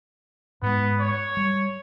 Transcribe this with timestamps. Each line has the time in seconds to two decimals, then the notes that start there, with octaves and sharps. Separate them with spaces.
0.62 G#2 G#3 B3
0.99 C#5
1.37 G3